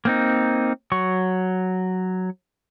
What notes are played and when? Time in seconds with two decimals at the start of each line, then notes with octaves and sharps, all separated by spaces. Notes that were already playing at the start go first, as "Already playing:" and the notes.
0.05 A#3 C4 D#4
0.92 F#3 C#6